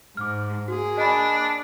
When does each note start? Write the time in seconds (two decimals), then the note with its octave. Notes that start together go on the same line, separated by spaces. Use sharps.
0.17 G#2 D6 F6
0.68 A#3 F#4 G#4
0.98 D4 D#5 G#5 B5